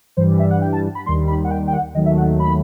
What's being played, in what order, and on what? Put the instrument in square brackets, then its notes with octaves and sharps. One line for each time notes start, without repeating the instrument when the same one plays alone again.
[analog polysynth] G2 E3 G3 C5
E5
F#5
G5
A5
B5
D#2 D#3 G3 C6
B5
F#5
G5
G5
F#5
D#2 D#3 F#3 A3 D#5
E5
F#5
B5